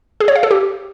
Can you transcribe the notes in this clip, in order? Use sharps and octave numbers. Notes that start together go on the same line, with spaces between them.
G#4
C#5
F5
A4
G4